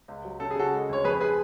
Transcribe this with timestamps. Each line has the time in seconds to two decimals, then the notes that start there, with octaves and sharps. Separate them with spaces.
0.08 C#2
0.25 F#3
0.40 C#3 A4
0.51 G#4
0.56 C#3 F#4 A4
0.73 G#3
0.89 D2 C#5
1.04 F2 G#4 B4
1.20 G#4 B4